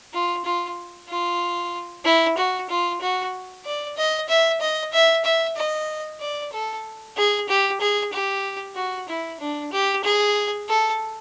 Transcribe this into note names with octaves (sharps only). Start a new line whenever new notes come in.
F4
F4
F4
E4
F#4
F4
F#4
D5
D#5
E5
D#5
E5
E5
D#5
D5
A4
G#4
G4
G#4
G4
F#4
E4
D4
G4
G#4
A4